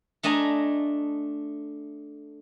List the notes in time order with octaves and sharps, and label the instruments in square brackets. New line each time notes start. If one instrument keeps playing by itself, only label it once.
[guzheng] A3 D4 D#5 G#5 A#5